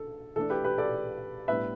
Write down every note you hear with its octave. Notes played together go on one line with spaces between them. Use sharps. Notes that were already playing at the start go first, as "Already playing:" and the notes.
Already playing: D3 A4
E3 A3 D4 A4
G4 B4
G4 B4
A4 D5
A2 G3 B3 D4 B4 E5